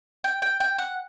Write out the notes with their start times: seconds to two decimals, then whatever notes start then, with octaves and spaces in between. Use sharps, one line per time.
0.24 G5
0.42 G5
0.60 G5
0.78 F#5